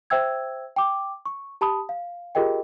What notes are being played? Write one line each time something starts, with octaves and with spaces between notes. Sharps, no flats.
C5 E5 G5 E6 G#6
G5 D6
C#6
G4 A5 B5 D#6
F5
F4 G4 G#4 A#4 D#5 G5